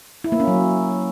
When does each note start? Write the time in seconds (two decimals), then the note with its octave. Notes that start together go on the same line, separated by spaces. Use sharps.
0.24 E4
0.32 A#3
0.40 C#4
0.47 F#3